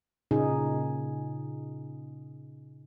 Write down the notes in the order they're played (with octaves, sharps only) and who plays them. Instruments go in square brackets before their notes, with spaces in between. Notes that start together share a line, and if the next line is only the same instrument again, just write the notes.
[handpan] A#2 C#3 D#4 G#4